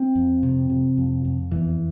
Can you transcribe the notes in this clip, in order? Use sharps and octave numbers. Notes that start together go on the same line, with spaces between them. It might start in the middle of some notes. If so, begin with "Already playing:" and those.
Already playing: C4
F2
C3
C3
F2
F2
E2 E3